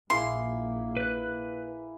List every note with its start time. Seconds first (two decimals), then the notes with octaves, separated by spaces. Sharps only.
0.10 A#1 A#2 A#3 E4 G#4 C6
0.97 B4 F#6